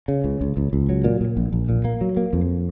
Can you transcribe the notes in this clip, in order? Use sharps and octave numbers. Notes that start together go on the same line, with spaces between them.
C#3
C#2
C#2
C#2
C#2
F#3
A#2
A#2
A#1
A#1
A#2
A#3
F#3
A#3
F2